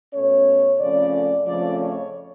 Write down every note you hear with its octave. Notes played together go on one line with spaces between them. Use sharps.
B2 A3 C#4 C#5
F2 C#3 F3 A3 C#4 D5
F2 C#3 F3 A3 D5
C#5